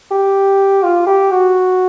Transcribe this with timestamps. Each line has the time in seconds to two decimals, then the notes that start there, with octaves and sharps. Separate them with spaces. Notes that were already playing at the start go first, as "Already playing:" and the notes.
0.11 G4
0.83 F4
1.06 G4
1.31 F#4